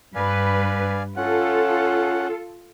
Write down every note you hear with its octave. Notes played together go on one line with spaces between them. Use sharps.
G2 G3 B4 D5 F5 G#5
C#4 F4 A4 F#5